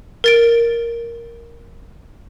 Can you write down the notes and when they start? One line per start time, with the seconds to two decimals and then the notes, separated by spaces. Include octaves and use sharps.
0.24 A#4 A6 D7